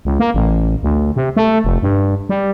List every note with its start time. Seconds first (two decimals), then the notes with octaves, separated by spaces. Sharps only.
0.05 C#2
0.20 A#3
0.34 A1
0.83 D2
1.16 C3
1.37 A3
1.64 F1
1.82 G2
2.29 G3